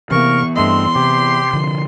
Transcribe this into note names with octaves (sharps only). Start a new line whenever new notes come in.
C3 E3 A#3 B3 A#4 C#6
G2 A3 C4 D#5 C6
C3 G4
D3 F3